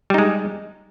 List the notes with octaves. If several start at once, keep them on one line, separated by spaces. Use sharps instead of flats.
G3 G#3 D#4